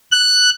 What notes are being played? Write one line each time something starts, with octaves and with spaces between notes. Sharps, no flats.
F#6